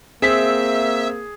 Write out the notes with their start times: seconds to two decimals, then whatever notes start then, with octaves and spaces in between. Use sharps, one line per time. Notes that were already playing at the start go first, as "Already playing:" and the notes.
0.22 A#3 C4 G#4 E5 E6 B6